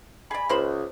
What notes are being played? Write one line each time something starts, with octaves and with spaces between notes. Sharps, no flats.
G#4 D5 G#5 B5
C#2 A#3 C5 B5